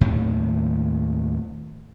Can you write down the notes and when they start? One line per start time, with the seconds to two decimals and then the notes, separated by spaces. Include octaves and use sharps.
0.01 D#2 A2 C3 D#3